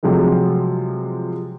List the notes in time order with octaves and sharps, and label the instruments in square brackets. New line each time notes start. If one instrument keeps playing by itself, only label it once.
[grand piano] C3 F3 F#3 G#3 A3